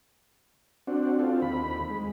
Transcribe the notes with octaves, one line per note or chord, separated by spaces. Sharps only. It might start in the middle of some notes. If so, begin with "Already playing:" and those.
C4 D4 F#4
C4 F4 A4
D#2 B5
G#3